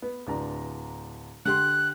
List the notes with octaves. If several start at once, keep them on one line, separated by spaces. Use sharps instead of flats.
B3
D1 D4 A#5
D3 G4 C6 F#6